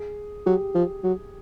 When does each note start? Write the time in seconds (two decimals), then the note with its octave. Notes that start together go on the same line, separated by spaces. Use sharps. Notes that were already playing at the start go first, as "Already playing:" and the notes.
Already playing: G#4
0.46 F#3 G4
0.75 F3
1.04 F#3